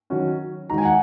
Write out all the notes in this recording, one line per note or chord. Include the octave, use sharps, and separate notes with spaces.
D#3 F#3 C#4 F#4
D#3 G#3 D#4 F#4 A#5
G#5
F#5